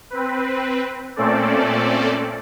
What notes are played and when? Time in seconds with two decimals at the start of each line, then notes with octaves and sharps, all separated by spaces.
0.10 C4 B4
1.16 A#2 A3 C4 C#4 A4 D5